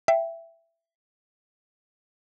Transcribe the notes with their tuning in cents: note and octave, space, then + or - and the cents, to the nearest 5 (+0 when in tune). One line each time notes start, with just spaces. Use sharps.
E5 +15 G5 +0